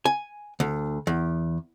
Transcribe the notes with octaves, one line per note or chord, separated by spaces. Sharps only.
G#5
D2
E2